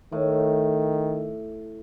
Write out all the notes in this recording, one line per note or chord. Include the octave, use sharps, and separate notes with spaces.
A2 D#3